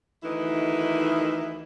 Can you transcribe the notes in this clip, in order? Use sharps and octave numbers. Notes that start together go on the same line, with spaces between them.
D2 D#3 E3 D#4 E4